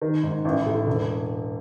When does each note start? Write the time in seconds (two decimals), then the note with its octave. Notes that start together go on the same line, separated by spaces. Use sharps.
0.02 D#3
0.23 G#2
0.45 A1
0.66 A2
0.87 E1